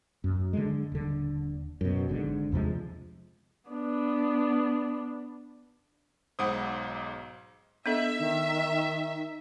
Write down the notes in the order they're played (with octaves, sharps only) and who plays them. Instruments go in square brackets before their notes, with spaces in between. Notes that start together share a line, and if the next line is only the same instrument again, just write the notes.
[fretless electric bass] F#2
D3 G#3
D#1 D3
F#2 B2
G#1 G#2 D3
E2 C3 F3 G#3
[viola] B3 D4
[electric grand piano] B1 G#2 D#6 [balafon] C5 F#5 B5
[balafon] B3 D4 A4 [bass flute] D#5 [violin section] E5
[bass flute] D#3 [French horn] D#4